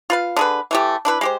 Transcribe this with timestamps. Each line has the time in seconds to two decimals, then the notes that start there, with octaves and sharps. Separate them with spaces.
0.10 F4 B4 F5
0.37 D3 G#4 B4
0.71 E3 A3 G4
1.05 D4 E4 B4
1.21 G#3 G4 C5